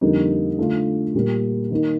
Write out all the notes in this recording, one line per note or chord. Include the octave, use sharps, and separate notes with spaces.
F2 D3 G3 A#3 D#4
D3 A3 D4 F4
A#2 G3 A#3
D#3 A#3 D#4